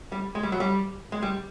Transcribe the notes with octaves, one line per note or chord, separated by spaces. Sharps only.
G3
G#3
G3
F#3
G3
G#3
G3